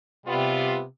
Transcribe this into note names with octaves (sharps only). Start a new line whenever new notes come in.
C3 G3 B3 F4